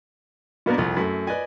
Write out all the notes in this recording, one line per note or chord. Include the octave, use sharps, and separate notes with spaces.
B2 A#3 B3 D4 A#4
C2 F2
F#2 A3
B4 D5 D#5 G#5